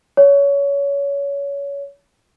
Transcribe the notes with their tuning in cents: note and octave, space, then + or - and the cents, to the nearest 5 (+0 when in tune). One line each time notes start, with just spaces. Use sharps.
C#5 +25